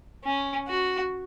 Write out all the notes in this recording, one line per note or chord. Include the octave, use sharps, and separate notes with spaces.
C#4
F#4